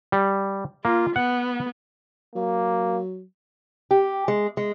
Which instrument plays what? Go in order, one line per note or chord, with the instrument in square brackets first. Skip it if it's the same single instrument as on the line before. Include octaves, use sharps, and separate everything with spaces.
[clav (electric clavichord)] G3
[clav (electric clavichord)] A#3 [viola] F4
[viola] B3 [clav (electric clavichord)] F#5
[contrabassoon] F#3 [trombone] A#3
[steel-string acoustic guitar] G4
G#3
G#3